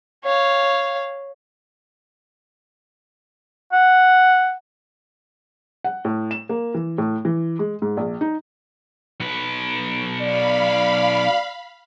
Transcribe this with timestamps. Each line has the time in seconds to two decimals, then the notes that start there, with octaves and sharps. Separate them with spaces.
0.24 C#5 F5
3.72 F#5
5.84 F#5
6.05 A2
6.31 E7
6.49 A#3
6.74 E3
6.98 A2
7.25 E3
7.59 G#3
7.82 G#2
7.97 A#1
8.21 D#4
9.20 B1 B4
10.22 D5 F5 B5